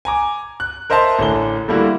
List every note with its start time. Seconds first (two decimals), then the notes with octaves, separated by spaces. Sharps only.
0.05 G#5 A#5 D6
0.60 F#6
0.90 A#4 C5 D#5 E5 A5 C6
1.18 A1 D3 G7
1.68 D3 G3 A3 A#3 E4 F#4